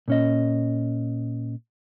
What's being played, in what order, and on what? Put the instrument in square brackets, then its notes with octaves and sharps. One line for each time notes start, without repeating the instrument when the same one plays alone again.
[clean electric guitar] A#2 C#4 D#5